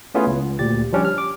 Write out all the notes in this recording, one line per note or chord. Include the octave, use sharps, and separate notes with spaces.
A3 B3 C#4 E4 F4 G#4
C#2
D2 A#2 G4 A6
F3 G3 C#4 D4 G4
F6
D6